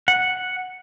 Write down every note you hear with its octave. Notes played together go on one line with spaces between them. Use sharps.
F#5